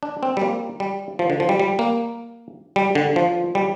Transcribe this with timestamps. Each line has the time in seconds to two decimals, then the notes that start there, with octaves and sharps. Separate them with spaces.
0.03 D4
0.23 C4
0.37 G3
0.42 A#3
0.80 G3
1.19 F3
1.30 D3
1.40 F3
1.49 G3
1.59 G3
1.79 A#3
2.76 G3
2.95 D3
3.16 F3
3.55 G3